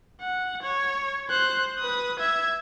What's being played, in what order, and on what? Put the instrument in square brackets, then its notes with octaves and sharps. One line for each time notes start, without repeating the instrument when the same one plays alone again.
[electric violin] F#5
C#5
C5 F#6
B4 D#6
E5 G#6